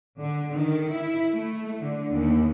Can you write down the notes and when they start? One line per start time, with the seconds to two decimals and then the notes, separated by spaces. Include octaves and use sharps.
0.19 D3
0.51 D#3
0.89 E4
1.31 A3
1.80 D3
2.13 D#2